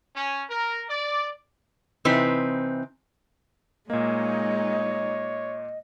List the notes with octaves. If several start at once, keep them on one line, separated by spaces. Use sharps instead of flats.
C#4
A#4
D5
C3 E3 C4 D#4 B4
A#2 G#3 A#3 D#4 C#5 D#5